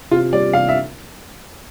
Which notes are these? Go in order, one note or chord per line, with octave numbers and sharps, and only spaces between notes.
C3 F4
G3 D5
C3 F5
E5